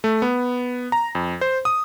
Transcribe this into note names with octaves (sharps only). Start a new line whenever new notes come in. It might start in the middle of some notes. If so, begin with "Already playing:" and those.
A3
B3
A#5
F2
C5
D#6